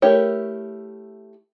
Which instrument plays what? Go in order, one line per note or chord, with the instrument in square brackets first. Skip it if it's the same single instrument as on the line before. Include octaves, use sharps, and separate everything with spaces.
[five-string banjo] A3 E4 G4 A#4 C#5